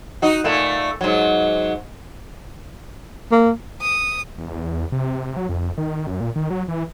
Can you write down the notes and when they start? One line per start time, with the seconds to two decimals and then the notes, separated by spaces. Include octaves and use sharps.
0.22 D#4 F#4
0.44 A#2 A3 A#3
1.01 G#2 F#3
3.31 A#3
3.81 D#6
4.38 E2
4.92 C3
5.37 F#3
5.49 F2
5.78 D#3
6.07 F#2
6.20 A#2
6.36 D#3
6.50 F#3
6.68 E3